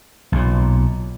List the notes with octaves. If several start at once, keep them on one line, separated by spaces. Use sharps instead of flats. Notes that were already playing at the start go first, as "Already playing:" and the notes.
B1 A#2